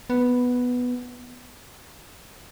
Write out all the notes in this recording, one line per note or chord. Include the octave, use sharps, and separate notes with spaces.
B3